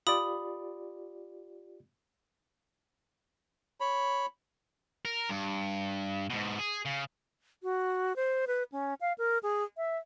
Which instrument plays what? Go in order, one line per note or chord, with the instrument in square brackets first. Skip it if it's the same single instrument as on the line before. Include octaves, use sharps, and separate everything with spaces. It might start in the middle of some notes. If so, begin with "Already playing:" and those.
[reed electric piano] F4 G4 D5 [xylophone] B5 D#6
[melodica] C#5 B5
[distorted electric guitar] A#4
G2
G#2 B2
G#4
C#3
[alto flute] F#4
C5
B4
C#4
F5
A#4
G#4
E5